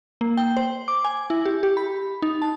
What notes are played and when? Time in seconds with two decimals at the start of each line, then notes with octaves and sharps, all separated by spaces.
0.21 A#3
0.37 G5
0.57 C5
0.88 D6
1.04 G#5
1.30 E4
1.45 G4
1.63 G4
1.77 B5
2.22 D#4
2.42 A5